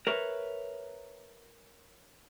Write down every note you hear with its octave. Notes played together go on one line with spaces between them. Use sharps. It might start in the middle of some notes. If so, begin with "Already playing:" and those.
A#4 B4 C#5 E5